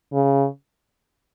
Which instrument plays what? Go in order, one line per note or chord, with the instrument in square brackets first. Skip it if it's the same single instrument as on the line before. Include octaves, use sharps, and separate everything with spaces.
[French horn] C#3